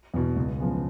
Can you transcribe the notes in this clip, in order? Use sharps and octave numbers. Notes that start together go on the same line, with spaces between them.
E2 B2
C#2
C#3 F3 G#3 B3